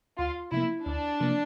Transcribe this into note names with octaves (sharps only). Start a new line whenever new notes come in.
D2 F4
C3 F3 A#3 E4
D2 D4
C3 F3 A#3